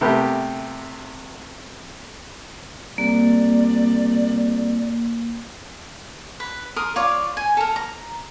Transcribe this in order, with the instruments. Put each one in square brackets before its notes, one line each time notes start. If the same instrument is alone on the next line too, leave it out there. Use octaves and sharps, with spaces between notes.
[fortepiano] C3 A3 B3 G4 A#4
[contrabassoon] C2 [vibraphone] A#3 [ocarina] D5
[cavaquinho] B4
A#4 C6 D#6
F4 C#5 D5
G#5
A4 A#4
A#5